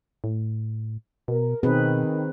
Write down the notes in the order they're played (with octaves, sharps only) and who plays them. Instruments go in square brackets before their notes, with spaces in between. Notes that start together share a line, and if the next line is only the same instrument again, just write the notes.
[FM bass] A2
[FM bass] B2 [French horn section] A#4
[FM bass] B2 [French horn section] D#3 [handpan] C4 G#4 B4